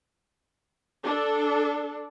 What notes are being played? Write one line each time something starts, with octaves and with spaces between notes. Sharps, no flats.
D4 A4